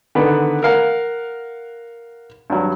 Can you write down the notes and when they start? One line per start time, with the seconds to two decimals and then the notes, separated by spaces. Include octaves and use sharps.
0.15 D3 D#3 B3 B4
0.63 A#4 F5 F#5
2.50 G2 F#3